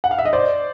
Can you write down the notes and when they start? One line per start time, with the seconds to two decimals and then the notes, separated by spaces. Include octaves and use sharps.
0.04 F#5
0.11 F5
0.19 E5
0.25 D#5
0.33 C5 D5